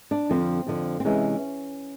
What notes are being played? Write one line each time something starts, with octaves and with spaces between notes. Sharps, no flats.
D4
F2 D3 F3 C4
F2 D3 F3
C4
C3 E3 G#3 C#4